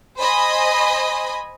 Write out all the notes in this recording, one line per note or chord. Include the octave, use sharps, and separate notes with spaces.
C5 D#5 G#5 B5